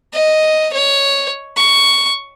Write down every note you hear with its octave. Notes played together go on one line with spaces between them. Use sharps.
D#5
C#5
C#6